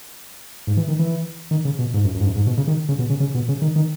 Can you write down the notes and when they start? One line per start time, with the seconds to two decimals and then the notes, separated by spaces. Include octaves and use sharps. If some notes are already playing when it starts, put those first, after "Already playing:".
0.67 G#2
0.77 E3
0.88 D#3
0.99 E3
1.51 D#3
1.65 C#3
1.79 B2
1.94 G#2
2.04 F#2
2.14 F#2
2.20 G#2
2.25 F#2
2.36 G#2
2.47 B2
2.57 C#3
2.67 D#3
2.89 C#3
2.99 B2
3.10 C#3
3.20 C#3
3.34 B2
3.48 C#3
3.62 D#3
3.76 D#3